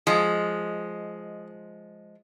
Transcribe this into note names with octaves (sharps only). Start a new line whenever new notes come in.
F3 G#3 D#5